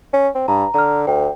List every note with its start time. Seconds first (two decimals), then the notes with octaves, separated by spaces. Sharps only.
0.13 C#4
0.35 C4
0.48 G2 A#5
0.74 D3 A#5 F6
1.07 D2 G5